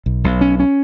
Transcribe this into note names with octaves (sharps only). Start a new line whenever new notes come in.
B1
B1
C#4
C#4